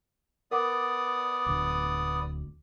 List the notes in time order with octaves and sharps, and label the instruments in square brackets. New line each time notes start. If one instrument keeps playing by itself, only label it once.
[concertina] B3 D5 D#6 [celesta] A#4 F#5 D6
[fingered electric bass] D1 D2 [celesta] D6